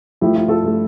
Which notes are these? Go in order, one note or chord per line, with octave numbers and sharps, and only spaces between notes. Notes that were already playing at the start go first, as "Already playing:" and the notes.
G2 F3 A3 E4 G4
F4
F4 A4
G2 F3 A3